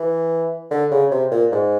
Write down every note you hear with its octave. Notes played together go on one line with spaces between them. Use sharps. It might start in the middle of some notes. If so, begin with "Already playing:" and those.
Already playing: E3
D3
C#3
C3
A#2
G#2